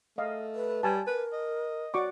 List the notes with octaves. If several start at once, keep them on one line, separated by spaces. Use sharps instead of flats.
A3 D#5 F5
B4
G3 G#5 A5
A#4 B4
D#5
F#4 D5 C#6 D6